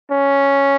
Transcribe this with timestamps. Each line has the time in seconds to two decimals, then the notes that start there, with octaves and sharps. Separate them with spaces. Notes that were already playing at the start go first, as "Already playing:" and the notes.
0.11 C#4